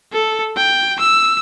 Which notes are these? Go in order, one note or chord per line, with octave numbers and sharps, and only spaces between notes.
A4
G5
E6